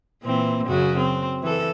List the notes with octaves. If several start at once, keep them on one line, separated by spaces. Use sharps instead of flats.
A#2 E3 C4
F#2 C#3 F#4
C4
E3 A4